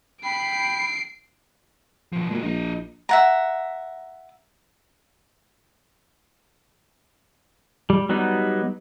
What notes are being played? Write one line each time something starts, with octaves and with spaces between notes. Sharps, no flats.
G5 B5 C7 D7
B2 F3
A#2 G#3 F#4
A#1 E4 D#5
E5 F#5 A#5
G3
F#3 G3 B3 D#4